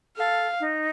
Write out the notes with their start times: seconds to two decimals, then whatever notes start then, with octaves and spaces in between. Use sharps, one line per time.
0.17 A4 F5
0.60 D#4